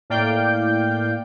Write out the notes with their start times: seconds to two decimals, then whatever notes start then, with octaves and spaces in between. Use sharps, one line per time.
0.10 A2 A#3 D5 F5 G5 G6